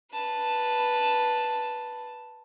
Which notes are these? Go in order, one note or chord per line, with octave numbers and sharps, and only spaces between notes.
B4 A5